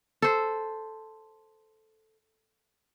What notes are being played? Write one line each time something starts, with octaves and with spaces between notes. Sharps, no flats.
A4 C5